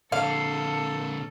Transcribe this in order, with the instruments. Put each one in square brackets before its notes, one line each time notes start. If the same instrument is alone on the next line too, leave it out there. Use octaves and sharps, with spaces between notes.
[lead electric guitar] A#2 D3 [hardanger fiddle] A4 [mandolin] F5